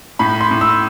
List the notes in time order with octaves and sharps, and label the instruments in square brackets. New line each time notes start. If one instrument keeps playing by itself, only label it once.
[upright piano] A2 B5
C6
A2
E6